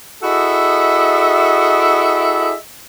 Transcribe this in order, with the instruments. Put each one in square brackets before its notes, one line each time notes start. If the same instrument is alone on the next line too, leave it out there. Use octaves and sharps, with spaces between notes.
[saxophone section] E4 F#4 G#4 A4 D#5 E5